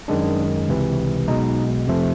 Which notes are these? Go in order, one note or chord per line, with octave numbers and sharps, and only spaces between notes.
F#2 D#3 G#3 D4
C#2 C3 E3
B1 B2 G#3 D#4
F2 C3 F3 A3